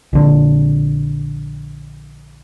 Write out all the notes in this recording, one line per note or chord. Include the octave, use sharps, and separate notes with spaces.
A#1 D3